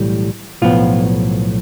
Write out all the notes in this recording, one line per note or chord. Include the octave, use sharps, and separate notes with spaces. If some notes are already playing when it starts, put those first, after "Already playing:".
Already playing: B1 A2 E3 G3
B1 A2 F3 B3 F4